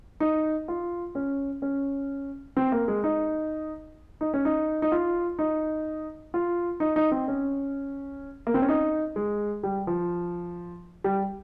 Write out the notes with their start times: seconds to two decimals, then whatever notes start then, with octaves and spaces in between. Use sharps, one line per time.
0.20 D#4
0.68 F4
1.15 C#4
1.62 C#4
2.57 C4
2.72 A#3
2.88 G#3
3.04 D#4
4.21 D#4
4.34 C#4
4.45 D#4
4.82 D#4
4.92 F4
5.39 D#4
6.34 F4
6.80 D#4
6.96 D#4
7.12 C4
7.28 C#4
8.47 A#3
8.54 C4
8.62 C#4
8.68 D#4
9.16 G#3
9.63 G3
9.87 F3
11.04 G3